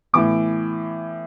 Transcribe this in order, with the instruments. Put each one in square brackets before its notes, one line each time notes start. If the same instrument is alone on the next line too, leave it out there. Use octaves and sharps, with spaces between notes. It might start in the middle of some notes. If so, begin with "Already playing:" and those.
[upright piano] A2 E3 B3 D6